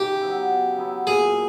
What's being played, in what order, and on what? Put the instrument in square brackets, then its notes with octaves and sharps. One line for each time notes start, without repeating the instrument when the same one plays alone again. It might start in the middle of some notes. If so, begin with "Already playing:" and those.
Already playing: [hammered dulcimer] C#3 D#4 [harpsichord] G4
[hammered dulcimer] F#3 B3 E4
C#3
F#3 B3 E4
[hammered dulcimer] A#2 [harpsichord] G#4